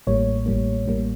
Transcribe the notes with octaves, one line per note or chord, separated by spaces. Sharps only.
A1 A2 G3 A#3 C#5
A1 A2 G3 A#3
A1 A2 G3 A#3